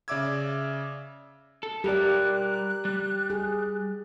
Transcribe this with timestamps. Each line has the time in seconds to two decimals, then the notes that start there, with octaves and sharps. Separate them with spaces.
0.08 C#3 D5 E5 D6 E6 G#6
1.63 A4
1.84 G3 G4 A#4 D5 F#6
2.85 G3
3.30 G#4